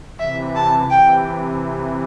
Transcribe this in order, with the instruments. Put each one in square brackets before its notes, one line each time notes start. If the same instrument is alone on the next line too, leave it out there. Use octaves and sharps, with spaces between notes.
[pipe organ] C3 E3 [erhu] E5
[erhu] A5
[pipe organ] C3 E3 [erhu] G5